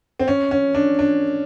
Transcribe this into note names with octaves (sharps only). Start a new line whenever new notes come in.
C4
C#4
C#4
D4
D4